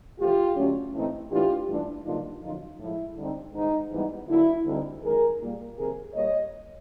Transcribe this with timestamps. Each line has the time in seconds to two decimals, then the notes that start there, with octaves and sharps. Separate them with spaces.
0.18 F2 C3 E3 A3 F4 G4
0.56 D3 F#3 A3 C#4
0.93 A2 E3 A3 C4 D#4
1.31 A2 E3 A3 D4 F4 G4
1.68 G2 E3 A3 D4
2.05 G2 D3 F#3 A#3 D4 D#4 F4
2.42 F#2 D3 F3 D#4 F4
2.79 A2 F3 G#3 E4
3.17 D3 G3 C4 D#4
3.54 G#2 D#3 G#3 D#4
3.91 G#2 E3 G3 B3 D#4
4.28 D3 F#3 A#3 E4
4.66 D2 D3 G3 C4 D#4
5.02 F#2 D#3 G#3 G#4 A#4
5.40 A#2 G3 A#3
5.76 F2 C3 D#3 G#4 A#4
6.14 A#2 G3 A#3 C#5 D#5